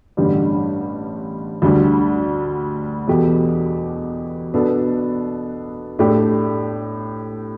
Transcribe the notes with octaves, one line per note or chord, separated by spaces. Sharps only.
A1 G2 D3 G3
D2 D3 G3 D4
E2 B2 A3 G4
B2 B3 D4 A4
A2 A3 D4 G4